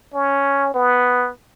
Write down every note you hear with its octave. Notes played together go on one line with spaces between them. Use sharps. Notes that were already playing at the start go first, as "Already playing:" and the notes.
C#4
B3